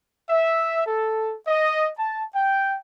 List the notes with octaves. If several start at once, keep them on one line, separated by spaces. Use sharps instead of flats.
E5
A4
D#5
A5
G5